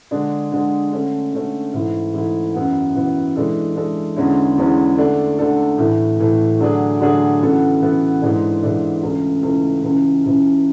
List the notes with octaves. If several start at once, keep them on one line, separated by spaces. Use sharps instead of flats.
D3 G#3 D4 G#4
D3 G#3 D4 G#4
D3 A3 C#4
D3 A3 C#4
G#2 E3 A3 E4
G#2 E3 A3 E4
F#2 E3 B3 F#4
F#2 E3 B3 F#4
E3 G#3 D4 A4
E3 G#3 D4 A4
E2 D3 G#3 C#4 E4
E2 D3 G#3 C#4 E4
D3 A3 D4 A4
D3 A3 D4 A4
A2 E3 A3
A2 E3 A3
D3 F#3 A3 D4 G#4
D3 F#3 A3 D4 G#4
C#3 E3 B3 F#4 A4
C#3 E3 B3 F#4 A4
G#2 E3 G#3 D4 A4
G#2 E3 G#3 D4 A4
C#2 C#3 E3 A3
C#2 C#3 E3 A3
C#2 C#3 E3
C#2 C#3 E3